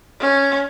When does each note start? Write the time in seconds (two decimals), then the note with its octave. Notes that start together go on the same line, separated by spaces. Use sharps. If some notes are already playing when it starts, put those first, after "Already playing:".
0.20 C#4